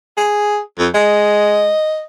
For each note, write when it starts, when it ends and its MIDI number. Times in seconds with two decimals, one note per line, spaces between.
0.17 0.59 68
0.79 0.88 41
0.94 1.73 56
0.94 2.03 75